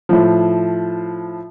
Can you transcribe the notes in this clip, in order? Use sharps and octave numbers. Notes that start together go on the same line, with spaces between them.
A2 F3